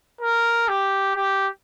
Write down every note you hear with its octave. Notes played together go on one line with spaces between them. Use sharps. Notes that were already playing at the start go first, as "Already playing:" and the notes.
A#4
G4
G4